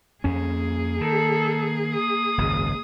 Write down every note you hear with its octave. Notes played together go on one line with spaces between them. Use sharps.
F2 A#3 C#4 G#4
D#3 A4
D#6
G#1 C#2 F#2